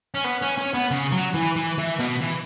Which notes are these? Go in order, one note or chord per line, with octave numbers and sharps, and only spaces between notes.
C#4
B3
C#4
C#4
B3
C#3
F#3
E3
E3
E3
B2
E3